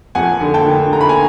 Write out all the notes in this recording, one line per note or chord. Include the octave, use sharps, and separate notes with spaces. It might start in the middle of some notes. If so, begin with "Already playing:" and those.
F2 F#5 G#5
D3
G5 A5
D3
D3 A#5
B5
G#5 A#5